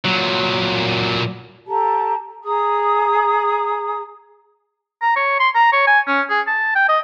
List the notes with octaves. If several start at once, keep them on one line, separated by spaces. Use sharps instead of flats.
A#2 F#3
G4 A4 A5 A#5
G#4 A#5 D#6
A#5
C#5
C6
A#5
C#5
G#5
C#4
G#4
A5
G5
D#5